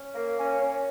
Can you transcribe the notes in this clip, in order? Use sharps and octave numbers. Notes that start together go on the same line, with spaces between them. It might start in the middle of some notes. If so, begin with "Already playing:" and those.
Already playing: C#4
A#3
C#4
C#4